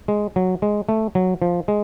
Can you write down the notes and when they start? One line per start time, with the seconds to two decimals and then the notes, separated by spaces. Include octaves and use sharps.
0.08 G#3
0.36 F#3
0.62 G#3
0.89 A3
1.15 F#3
1.42 F3
1.68 G#3